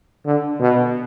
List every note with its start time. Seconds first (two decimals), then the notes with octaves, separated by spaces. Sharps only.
0.26 D3
0.60 B2